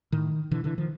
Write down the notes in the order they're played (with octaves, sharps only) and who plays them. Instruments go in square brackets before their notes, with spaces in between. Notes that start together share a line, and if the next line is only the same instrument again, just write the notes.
[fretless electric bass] A2 D#3
B2 D3 E3
D3 E3
D#3 F3